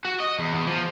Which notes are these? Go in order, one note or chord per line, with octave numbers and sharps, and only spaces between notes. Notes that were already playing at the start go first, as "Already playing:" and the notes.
F#4
D#5
E2
E2
F3